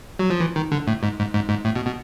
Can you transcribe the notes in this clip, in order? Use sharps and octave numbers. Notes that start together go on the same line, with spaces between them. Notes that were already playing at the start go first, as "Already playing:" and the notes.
F#3
F3
E3
D#3
D3
A2
G#2
G#2
G#2
G#2
A2
B2
B2